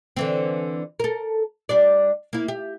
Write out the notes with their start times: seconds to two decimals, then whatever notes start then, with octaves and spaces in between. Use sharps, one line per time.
0.17 D3 E3 C4
1.00 A4 A#4
1.69 G3 D4 D5
2.33 A#3 E4
2.48 G4